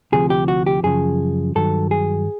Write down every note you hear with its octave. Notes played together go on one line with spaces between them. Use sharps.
D2 C3 F3 G#4
G4
F#4
G4
F#2 C#3 F3 G#4
G2 D#3 F#3 A4
G#4